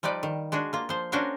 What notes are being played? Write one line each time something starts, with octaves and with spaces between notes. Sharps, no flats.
F3 G3 D#4 B4 D5
D#3
G#3 D4 F#4 G#4
A#3 F4
F3 C5
C#4 D4 F#4 A#4 C5 F5